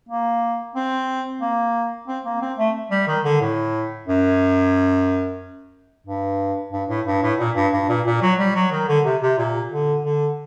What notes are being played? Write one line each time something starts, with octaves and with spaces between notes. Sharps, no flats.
A#3
C4
A#3
C4
A#3
C4
A3
G3
D#3
D3
A2
F#2
G2
G2
A2
G2
A2
A#2
G2
G2
A#2
A#2
F#3
G3
F#3
D#3
D3
C3
C3
A#2
D3
D3